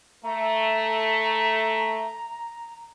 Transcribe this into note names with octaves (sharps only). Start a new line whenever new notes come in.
A3 A#5